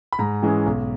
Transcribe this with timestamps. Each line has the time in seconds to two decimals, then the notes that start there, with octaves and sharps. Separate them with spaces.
0.12 B5
0.19 G#2 A#5
0.42 E3 G#3 C#4
0.66 B1